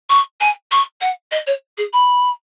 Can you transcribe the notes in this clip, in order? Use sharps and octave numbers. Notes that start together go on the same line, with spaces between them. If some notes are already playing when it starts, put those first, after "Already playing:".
C#6
G#5
C#6
F#5
D#5
C#5
G#4
B5